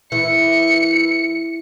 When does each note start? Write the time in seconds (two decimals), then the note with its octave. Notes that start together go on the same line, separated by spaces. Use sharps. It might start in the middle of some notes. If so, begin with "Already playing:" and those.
0.12 E3 C#7